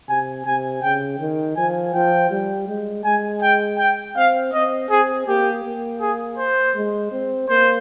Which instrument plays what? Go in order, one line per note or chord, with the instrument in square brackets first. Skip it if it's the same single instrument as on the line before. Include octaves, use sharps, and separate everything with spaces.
[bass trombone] C3 [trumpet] G#5
[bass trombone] C3 [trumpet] G#5
[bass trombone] C#3 [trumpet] G5
[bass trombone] D#3
[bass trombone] F3 [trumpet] G#5
[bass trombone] F3 [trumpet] G5
[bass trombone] G3
G#3
[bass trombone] G#3 [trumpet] G#5
[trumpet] G5
G5
[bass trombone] C4 [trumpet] F5
[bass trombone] C4 [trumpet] D#5
[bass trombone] C4 [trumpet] G#4
[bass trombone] A#3 [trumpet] G4
[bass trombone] A#3
[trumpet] G#4
C5
[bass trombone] G#3
C4
[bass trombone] A#3 [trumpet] C5